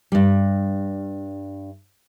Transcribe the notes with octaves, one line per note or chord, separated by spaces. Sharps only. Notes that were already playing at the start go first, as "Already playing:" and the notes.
G2 G3